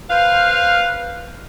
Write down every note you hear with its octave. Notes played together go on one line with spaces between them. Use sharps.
B4 C5 F5